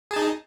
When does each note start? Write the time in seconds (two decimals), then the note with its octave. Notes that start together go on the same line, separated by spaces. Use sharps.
0.11 G#4
0.14 A5
0.16 D#4